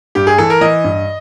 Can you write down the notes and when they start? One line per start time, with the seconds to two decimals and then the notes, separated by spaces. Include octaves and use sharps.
0.15 G2 G4
0.27 G#4
0.38 E3 A4
0.50 A#4
0.61 E3 D#5
0.84 G2